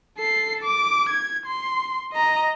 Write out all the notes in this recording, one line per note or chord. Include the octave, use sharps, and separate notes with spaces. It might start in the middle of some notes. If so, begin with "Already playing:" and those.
A4 C7
D6
G#6
C6
D#5 A#5